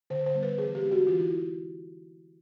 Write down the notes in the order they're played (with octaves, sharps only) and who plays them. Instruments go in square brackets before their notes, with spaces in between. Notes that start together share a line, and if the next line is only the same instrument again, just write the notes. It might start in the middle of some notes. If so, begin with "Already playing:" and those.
[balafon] D3 C5
C5
G3 B3
B4
E3 G#4
G4
G#3 C4
F#4
E3 F4
E4